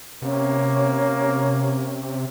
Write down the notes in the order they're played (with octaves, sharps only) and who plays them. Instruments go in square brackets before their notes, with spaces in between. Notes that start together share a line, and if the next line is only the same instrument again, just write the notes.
[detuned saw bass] C3 [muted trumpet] A#3 [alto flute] C#4